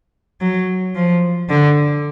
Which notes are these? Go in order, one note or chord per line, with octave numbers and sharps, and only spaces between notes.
F#3
F3
D3